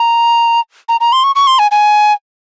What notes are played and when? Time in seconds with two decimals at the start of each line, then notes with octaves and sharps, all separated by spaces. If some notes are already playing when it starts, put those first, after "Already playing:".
Already playing: A#5
0.89 A#5
1.00 A#5
1.12 C6
1.24 C#6
1.35 C#6
1.47 C6
1.59 G#5
1.71 G#5